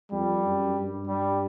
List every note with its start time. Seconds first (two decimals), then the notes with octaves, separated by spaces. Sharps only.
0.11 F2 G3
0.44 F#2
0.76 G2
1.07 G3